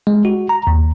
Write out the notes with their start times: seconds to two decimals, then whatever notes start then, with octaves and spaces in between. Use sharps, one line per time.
0.07 G#3
0.25 F#4
0.49 A#5
0.67 D#2